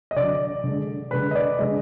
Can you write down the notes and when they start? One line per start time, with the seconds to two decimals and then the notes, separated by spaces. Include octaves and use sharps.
0.11 D#5
0.16 D3 F#3 D5
0.64 D3 G#3
1.11 D3 G#3 B4
1.31 D#5
1.35 D5
1.59 D3 G#3 D#5